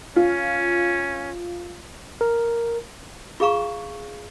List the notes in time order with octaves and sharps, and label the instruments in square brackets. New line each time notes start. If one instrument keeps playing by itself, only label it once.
[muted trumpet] C#4 [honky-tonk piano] F4
[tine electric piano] A#4
[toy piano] F4 G#4 F5 A#5 C#6